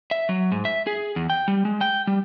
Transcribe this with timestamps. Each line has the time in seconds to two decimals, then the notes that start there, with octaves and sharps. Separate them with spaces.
0.11 E5
0.29 F#3
0.52 G#2
0.65 E5
0.87 G#4
1.16 E2
1.30 G5
1.48 G3
1.65 G#3
1.81 G5
2.07 G3